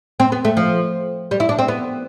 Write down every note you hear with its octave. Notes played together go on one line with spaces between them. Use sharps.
C4
B3
A3
F3
G3
E4
D4
C4
B3